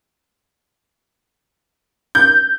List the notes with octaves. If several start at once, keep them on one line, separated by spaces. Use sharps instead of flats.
G6